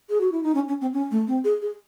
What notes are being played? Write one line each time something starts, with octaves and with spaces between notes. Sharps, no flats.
G#4
F#4
E4
D#4
C#4
C#4
C4
C#4
A3
C4
G#4
G#4